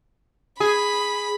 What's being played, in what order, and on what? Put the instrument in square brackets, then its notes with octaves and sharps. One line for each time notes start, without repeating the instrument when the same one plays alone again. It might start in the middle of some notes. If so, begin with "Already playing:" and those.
[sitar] G#4 [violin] B5